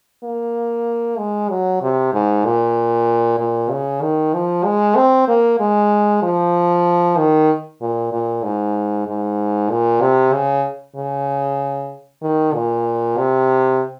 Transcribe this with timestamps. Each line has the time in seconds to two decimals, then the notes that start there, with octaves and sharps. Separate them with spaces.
0.24 A#3
1.18 G#3
1.49 F#3
1.82 C3
2.13 G#2
2.45 A#2
3.39 A#2
3.71 C#3
4.02 D#3
4.34 F3
4.65 G#3
4.96 C4
5.28 A#3
5.60 G#3
6.22 F3
7.18 D#3
7.81 A#2
8.12 A#2
8.44 G#2
9.08 G#2
9.70 A#2
10.01 C3
10.33 C#3
10.96 C#3
12.22 D#3
12.54 A#2
13.18 C3